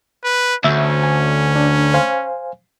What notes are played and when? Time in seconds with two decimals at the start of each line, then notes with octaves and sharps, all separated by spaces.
0.24 B4
0.64 D2 C#4 E5 E6
1.03 G#5
1.56 D4
1.94 C5 F5 G#5